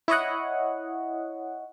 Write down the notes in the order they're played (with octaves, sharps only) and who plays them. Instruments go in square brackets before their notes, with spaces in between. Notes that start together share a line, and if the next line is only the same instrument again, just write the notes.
[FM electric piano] E4 C#5 D#5 F#5